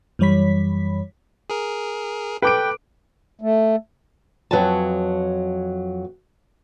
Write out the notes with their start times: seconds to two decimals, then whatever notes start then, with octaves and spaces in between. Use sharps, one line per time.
0.19 F#2 E3 G3 C#5 B5 B6
1.50 G#4 A#4
2.42 A4 B4 G5 D6 D7
3.41 A3
4.51 F2 F#3 B4 C#5 G#5 A5